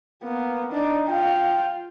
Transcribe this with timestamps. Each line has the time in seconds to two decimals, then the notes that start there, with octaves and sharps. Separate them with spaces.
0.23 A#3 B3
0.72 D4 D#4 D5
1.08 F4 F5 G5